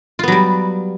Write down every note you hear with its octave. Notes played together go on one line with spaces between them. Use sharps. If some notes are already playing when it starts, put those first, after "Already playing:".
F#3 G3 B3 F4